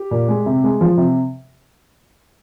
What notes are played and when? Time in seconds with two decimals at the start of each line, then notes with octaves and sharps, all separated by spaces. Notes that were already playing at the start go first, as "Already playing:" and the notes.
Already playing: G4
0.11 A#2
0.28 G#3
0.46 C3
0.64 G#3
0.81 F3
0.97 C3